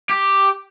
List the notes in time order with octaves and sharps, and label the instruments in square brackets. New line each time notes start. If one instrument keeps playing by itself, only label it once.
[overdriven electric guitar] G4